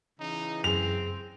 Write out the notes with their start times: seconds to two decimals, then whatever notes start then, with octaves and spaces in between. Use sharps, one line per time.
0.20 C#3 E3 D#4
0.64 F#2 C4 G#4 F7